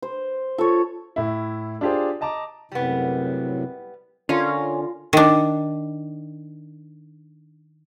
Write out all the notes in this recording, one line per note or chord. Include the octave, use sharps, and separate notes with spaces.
C5
F4 A4 C#5
A2 E4
D4 F4 G4 G#4 C5
D#5 A5 A#5 D6
F#2 A2 C3 G3 B3
D3 C#4 F4 A#4
D#3 D4